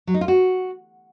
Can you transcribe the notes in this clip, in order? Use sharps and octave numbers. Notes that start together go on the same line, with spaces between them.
F#3
D#4
F4
F#4